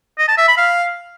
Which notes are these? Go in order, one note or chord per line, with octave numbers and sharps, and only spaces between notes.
D#5
A5
E5
B5
F5